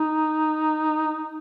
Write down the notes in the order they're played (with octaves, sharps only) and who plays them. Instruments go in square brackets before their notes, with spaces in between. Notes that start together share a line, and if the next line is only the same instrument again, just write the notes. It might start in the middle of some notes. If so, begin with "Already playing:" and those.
Already playing: [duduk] D#4